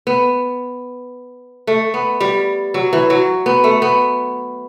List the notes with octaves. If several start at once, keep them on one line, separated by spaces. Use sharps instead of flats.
B3
A3
B3
G3
F#3
E3
F#3
B3
A3
B3